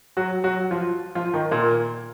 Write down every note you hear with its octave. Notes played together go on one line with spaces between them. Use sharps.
F#3 F#4
F#3 F#4
F3 F4
F3 F4
D#3 D#4
A#2 A#3